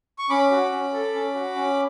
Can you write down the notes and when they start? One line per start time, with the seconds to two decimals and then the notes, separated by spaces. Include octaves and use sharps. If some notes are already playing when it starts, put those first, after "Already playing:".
0.19 C#6
0.30 C#4 B5 D6
0.51 F#4
0.72 C#4
0.93 A4
1.14 C#4
1.35 F#4
1.56 C#4